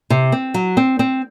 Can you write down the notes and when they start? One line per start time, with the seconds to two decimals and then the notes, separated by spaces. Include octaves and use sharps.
0.10 C3
0.32 C4
0.54 F#3
0.77 C4
0.99 C4